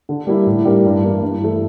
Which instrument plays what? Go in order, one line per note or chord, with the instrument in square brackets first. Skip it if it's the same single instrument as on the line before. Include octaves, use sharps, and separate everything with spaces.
[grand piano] D3
G3 A#3 E4 G4
A2
G3 D4 G4 A#4
G2
E3 A#3
G2
E3 A3